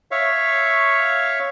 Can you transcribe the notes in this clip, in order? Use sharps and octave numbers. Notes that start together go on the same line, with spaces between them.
C#5 E5 F5 C#6